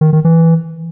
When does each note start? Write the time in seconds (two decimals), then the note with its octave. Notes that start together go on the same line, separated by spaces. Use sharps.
0.01 D#3
0.13 D#3
0.25 E3